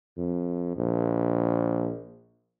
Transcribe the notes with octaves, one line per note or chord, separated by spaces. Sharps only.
F2
A#1